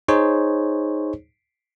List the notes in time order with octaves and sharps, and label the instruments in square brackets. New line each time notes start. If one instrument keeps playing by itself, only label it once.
[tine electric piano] D#4 G#4 C5 C#5